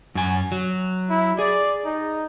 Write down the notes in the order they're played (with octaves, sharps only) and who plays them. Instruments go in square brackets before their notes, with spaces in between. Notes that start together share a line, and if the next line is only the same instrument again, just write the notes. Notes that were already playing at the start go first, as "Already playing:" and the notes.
[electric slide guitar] F#2 G#5
F#3
[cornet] E4
[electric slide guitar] G#4 [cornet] D5
[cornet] D#4